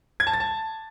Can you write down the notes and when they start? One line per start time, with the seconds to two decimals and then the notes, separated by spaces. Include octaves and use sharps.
0.20 G#6
0.27 A5
0.33 A6
0.40 A5